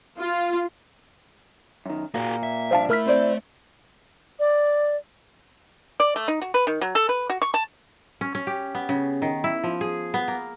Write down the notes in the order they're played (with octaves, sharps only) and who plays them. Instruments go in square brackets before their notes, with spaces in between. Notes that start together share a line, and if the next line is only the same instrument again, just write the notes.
[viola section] F4
[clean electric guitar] F#2 D#3
[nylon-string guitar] A#2 [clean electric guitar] A#3 [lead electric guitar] F#4 G#4
[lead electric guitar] E5
[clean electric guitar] C2 F3 D4 [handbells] C5 F5 A5
[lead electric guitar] A3 [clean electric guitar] E4 [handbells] A#4 F6 B6
[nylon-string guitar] C4 C5 D5
[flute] D5
[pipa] D5
A3
D#4
F#4
B4
D#3
F#3
A4
B4
F#4
C#6
A5
[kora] C#4
C#4
G4
B3
C#3
D#3
E4
F3
G#4
B3
A#3